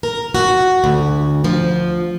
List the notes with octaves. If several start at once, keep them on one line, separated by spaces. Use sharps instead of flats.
A#4
F#4
D2
F3